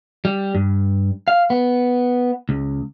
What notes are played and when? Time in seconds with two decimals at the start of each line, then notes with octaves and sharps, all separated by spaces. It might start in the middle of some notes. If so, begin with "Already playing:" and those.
0.25 G3
0.55 G2
1.28 F5
1.50 B3
2.49 C#2